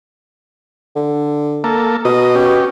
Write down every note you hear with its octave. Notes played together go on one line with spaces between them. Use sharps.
D3
A#3 A4
B2 D#5
C#4 G4